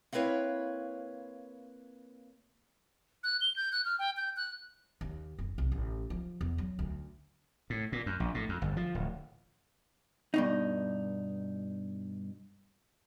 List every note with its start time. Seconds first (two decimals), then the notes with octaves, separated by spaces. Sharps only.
0.13 A#3 C4 E4 B4 C#5 F5
3.24 F#6
3.41 G7
3.56 G6
3.72 F#6
3.85 F6
3.99 G5
4.17 G6
4.37 F#6
5.01 D#2
5.39 F#1
5.58 C2
5.72 A1
6.10 F3
6.41 E2
6.58 F#3
6.79 D2
7.70 A2
7.92 A#2
8.06 F#2
8.20 A#1
8.34 A2
8.49 F2
8.62 G1
8.77 F3
8.95 D1
10.34 G2 B2 D#4